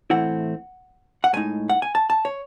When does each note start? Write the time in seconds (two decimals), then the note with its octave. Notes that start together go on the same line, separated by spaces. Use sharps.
0.10 A2 E3 A3 C4 E4 F#5
1.24 F#5
1.33 A2 G#3 D#4 G#5
1.69 F#5
1.82 G#5
1.95 A5
2.10 A5
2.25 C#5